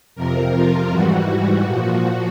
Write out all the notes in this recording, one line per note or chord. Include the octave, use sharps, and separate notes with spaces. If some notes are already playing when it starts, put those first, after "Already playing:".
F2 C3 F3 A#4
F4
G#2 E3 G3 F#4
A#2 F3